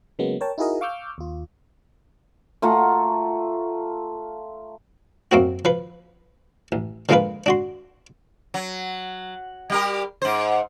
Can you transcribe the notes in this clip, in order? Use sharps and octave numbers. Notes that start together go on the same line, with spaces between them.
C#3 F#3 G#3 A#3 B3
A#4 C#5 G5 A5
D#4 E4 F#4 G#4 A#4 D#5
F5 C#6 D6 E6 F6 G6
D#2 F4
A3 F4 F#5 A#5
F#2 A#3 C4 F#4
F3 B4
A1
D3 F3 G#3 A#3 F4 B4
D4 F#4 C6
F#3
G3 G4 A#4
G#2 C5